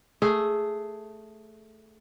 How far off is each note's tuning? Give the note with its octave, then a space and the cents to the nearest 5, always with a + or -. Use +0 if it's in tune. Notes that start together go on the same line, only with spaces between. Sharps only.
A3 +0 G#4 +5